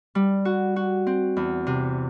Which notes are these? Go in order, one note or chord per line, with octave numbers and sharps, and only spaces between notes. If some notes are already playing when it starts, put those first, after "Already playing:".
G3
F#4
F#4
C4
E2
C3